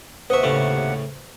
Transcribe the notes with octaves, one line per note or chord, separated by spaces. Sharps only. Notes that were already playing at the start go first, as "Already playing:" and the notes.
D#2 C3 B4 C5 D#5 E5 F#5 C#6
A2 C#3